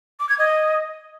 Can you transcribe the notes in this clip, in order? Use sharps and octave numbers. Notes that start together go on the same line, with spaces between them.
D6
G#6
D#5